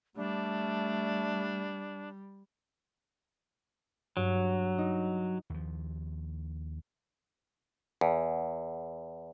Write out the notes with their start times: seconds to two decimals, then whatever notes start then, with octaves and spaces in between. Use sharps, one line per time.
0.16 G3 A3 D4
4.17 G2 F#3
4.78 D#4
5.50 D#2 F3
8.01 E2